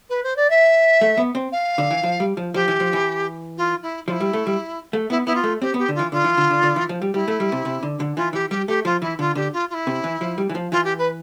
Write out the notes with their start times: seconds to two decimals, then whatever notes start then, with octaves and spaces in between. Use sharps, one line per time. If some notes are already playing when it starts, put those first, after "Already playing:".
0.09 B4
0.23 C5
0.36 D5
0.50 E5
1.01 A3
1.18 B3
1.35 C4
1.52 F5
1.78 D3
1.91 E3
2.04 F3
2.20 G3
2.37 F3
2.54 F3 G4
2.68 E3
2.80 F3
2.93 E3
3.57 F4
3.82 E4
4.07 F3 E4 F4
4.21 G3
4.33 A3
4.47 G3
4.93 A3
5.10 B3 E4
5.26 B3 E4
5.35 F4
5.44 A3
5.61 C4 G4
5.74 B3
5.78 G4
5.88 D3
5.95 E3 F4
6.12 D3 F4
6.24 E3
6.37 D3
6.51 D3
6.63 D3
6.76 E3
6.89 F3
7.02 G3
7.14 G3 E4
7.28 A3
7.40 G3
7.52 C3
7.65 C3
7.83 D3
8.00 D3
8.17 E3 F4
8.33 E3 G4
8.50 G3 G4
8.67 A3 G4
8.85 F3 F4
9.02 E3 E4
9.19 D3 F4
9.35 D3 G4
9.53 F4
9.70 F4
9.74 E4
9.87 C3
10.04 E3
10.21 F3
10.38 G3
10.49 E3
10.55 F3
10.72 E3 F4
10.84 G4
10.98 B4